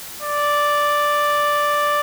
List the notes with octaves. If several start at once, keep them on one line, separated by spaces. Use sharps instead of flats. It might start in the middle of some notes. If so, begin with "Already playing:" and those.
D5